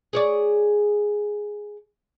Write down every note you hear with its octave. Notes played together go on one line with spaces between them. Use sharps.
G#4 C#5 D5